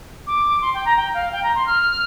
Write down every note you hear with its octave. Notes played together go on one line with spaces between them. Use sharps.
D6
C6
G5
A#5
G5
F5
G5
A#5
C6
F6